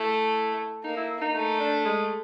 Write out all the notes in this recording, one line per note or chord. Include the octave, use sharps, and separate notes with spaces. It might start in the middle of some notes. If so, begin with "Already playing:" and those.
Already playing: A3 E4
A#3 D#4
E4
D#4
A3 D#4
D4
G#3